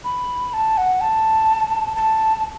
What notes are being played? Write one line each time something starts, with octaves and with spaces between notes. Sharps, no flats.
B5
A5
F#5
A5
A5